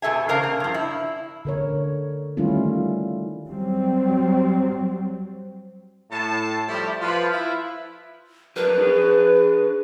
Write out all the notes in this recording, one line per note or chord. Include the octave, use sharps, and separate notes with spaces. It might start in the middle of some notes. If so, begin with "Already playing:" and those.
E2 B2 A4 E5 G#5
C#3 D4 A#4 C5 F5
A#3
G2 F3
E4
D3 A#4 C#5
D#3 G3 A3 C#4 E4 F4
F#3 G3 C4
A2 A5
F3 G3 A3 E4 G4
F3 F4 B4
E4
F#3 D4 A#4 B4
D4 G#4